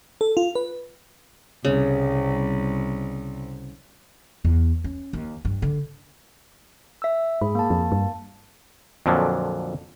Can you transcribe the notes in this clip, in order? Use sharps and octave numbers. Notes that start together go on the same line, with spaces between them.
A4
F4
B4
C2 C#3
E2
C#4
D#2
G2
D3
E5 E6
G#2 G#4 B5
A#3 A5
F2
G2
F2 A#2 D3 F3 F#3